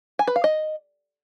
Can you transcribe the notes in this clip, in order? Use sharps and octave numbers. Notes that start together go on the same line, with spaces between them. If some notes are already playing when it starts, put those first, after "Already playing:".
G#5
B4
F5
D#5